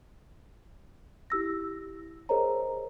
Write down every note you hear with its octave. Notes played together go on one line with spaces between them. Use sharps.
E4 G4 E6 A#6
G#4 A#4 C5 C#5 D#5 A#5